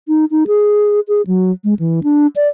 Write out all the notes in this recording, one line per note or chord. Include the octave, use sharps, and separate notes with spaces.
D#4
D#4
G#4
G#4
F#3
G#3
E3
D4
D5